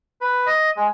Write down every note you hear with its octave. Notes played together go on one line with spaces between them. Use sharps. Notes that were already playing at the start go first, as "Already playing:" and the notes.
B4
D#5
G#3